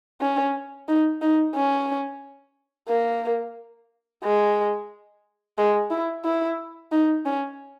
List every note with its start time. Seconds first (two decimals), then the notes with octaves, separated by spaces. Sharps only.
0.21 C#4
0.89 D#4
1.22 D#4
1.55 C#4
2.89 A#3
4.24 G#3
5.58 G#3
5.91 E4
6.25 E4
6.92 D#4
7.25 C#4